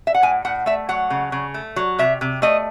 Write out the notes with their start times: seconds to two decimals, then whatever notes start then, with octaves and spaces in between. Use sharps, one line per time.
0.07 E5
0.14 F#5
0.23 A2 G#5
0.45 A2 F#5
0.66 A3 E5
0.89 F#3 F#5
1.10 C#3
1.32 C#3
1.54 A3
1.76 F#3
1.99 C3 E5
2.21 C3
2.42 A3 D#5